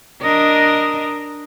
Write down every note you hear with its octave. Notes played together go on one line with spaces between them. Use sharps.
D4 A#4 D#5